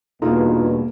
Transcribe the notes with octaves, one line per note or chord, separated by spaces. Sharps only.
E2 G2 B2 A#3 D#4 F4 G#4 A4